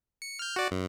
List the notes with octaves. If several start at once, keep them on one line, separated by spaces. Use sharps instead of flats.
C#7
F6 G6
F#4 D5
F#2